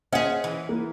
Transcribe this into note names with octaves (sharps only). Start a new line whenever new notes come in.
C#4 G#4 C5 D#5 F#5
E3
A#3